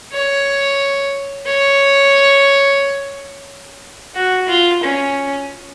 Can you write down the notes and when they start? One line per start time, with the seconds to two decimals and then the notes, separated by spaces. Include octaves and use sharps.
0.13 C#5
1.47 C#5
4.16 F#4
4.48 F4
4.83 C#4